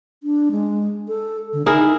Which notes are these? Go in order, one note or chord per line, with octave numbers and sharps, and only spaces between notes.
D4
G#3
A4
D3
D#4 E4 G#4 A#4